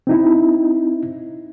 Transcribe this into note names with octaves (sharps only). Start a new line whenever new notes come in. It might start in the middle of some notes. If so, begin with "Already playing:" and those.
C4 D#4 E4